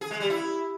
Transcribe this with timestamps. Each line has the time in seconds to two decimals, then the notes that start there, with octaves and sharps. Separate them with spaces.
0.01 G#4
0.11 G#3
0.20 G3
0.30 E4